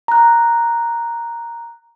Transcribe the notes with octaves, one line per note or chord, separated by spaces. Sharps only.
A#5 F#6